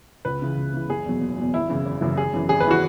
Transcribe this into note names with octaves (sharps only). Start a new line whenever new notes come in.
C#2 B4
C#3 E3
C#2
C#3 E3
F#1 G#4
E2 B2 F#3
F#1
E2 B2 F#3
G#1 E4
F#2 C#3 E3
G#1
F#2 C#3 E3
G#1 G#4
F#2 E3
G#1 G#4
B4
E3 F#4